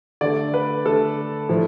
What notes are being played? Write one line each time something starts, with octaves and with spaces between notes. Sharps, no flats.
D3 A3 D5
B4
D3 A3 A4
A2 F3 A3